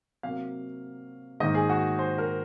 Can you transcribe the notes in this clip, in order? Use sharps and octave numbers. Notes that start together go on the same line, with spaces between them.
C3 F#3 A#3 F5
G#2 D#3 A#3 D#4 D#5
G#4
F#4
C5
A#4